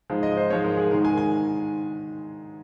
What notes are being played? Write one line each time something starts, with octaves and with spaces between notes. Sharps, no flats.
G#2 F3 G#3
D#5
C5
G#2 F3 G#3 C#5
A#4
G#4
G#2 D#3 G#3 A#4
G#5
G#5